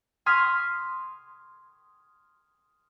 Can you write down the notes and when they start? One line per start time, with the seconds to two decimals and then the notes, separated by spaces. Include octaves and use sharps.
0.26 C6 D#6 F6 G#6 B6